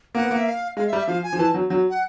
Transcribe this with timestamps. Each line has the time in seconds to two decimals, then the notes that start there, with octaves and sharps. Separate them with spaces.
0.15 A#3 F#5
0.23 B3
0.31 A#3
0.37 E5
0.46 F5
0.77 G#3 F5
0.88 E5
0.93 G3
0.98 E5
1.07 F3 F5
1.23 G#5
1.33 F3
1.38 E3 A5
1.54 F#3
1.70 F#3
1.90 F#5